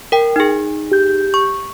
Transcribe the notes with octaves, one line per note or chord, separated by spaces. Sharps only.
A#4 G5
D#4 G#4
G4 G6
C#6